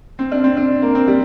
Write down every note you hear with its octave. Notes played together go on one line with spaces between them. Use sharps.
C4
D4
C4
D4
A#3
C4
G3